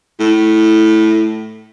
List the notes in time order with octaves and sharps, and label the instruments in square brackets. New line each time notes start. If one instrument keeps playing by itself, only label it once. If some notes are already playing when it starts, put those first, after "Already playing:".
[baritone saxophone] A2